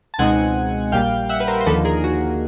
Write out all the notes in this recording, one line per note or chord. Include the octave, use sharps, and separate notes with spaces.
A5
C#2 B2 G#3 C4 D#4 F#5 G#5
A#1 A#2 G3 F5 G5
E5 F#5
B4
A#4 C5
C5
D#2 D3 F3 A#3 D#4 A4 B4
G#4 A#4
F#4